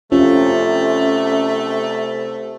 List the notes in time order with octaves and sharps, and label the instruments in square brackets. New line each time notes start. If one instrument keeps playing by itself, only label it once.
[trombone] C3 [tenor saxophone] A3 [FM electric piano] C#4 [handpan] F4 G4